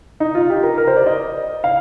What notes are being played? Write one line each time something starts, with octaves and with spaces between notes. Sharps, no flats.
D#4
F4
G4
A#4
A#4
C5
D5
D#5
F5